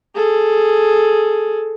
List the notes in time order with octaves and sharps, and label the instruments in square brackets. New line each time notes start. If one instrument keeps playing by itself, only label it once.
[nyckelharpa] G#4 A4